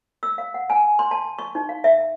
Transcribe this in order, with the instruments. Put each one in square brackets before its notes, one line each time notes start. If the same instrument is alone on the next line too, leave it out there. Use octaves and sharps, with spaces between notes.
[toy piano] E6
F5
F#5
G#5
C6
A5
C#6
D#4
F5
E5